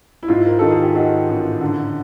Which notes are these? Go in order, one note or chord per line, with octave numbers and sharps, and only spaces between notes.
E4
G#2 F4
A#4
D#3 A4
G#4
G4
D#3 F#4
A1
D3